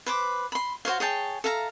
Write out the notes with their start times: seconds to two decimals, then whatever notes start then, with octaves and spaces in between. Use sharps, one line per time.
0.06 B4 C5 D6
0.52 B5 C6
0.85 F#4 C5 C#5 F5
1.00 G#4 C#5 G5 A5
1.44 A4 E5 F5 A#5